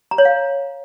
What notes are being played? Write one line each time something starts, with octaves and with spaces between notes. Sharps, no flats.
A#5
C#5
F5